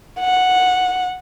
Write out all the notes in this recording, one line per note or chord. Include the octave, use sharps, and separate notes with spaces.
F#5